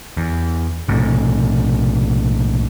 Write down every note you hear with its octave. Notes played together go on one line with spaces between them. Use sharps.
E2
B1 A2 C3